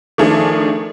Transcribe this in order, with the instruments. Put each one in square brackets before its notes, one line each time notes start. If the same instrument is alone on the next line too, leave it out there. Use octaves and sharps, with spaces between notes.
[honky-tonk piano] D#3 F3 A3 D4 G#4